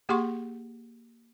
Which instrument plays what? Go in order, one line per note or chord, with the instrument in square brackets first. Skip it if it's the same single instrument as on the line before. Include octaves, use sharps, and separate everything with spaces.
[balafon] A#3 G4 G#4 F#5 C6 C#6